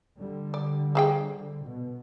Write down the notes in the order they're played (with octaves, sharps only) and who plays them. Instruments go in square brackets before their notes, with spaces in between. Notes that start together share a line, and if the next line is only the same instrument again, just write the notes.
[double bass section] D3 G3
[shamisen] D5
F3 G#4 G5
[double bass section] B2